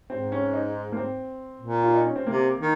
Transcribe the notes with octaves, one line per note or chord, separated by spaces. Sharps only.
G#2 C4
C#4
D#4
A#3
C4
A#2
F4
D#4
C#4
C4
C3 A#3
D#3